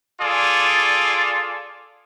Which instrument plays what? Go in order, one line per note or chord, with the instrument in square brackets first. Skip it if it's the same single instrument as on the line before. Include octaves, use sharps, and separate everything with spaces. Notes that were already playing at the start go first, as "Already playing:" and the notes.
[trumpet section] F4 G#4 A4 D5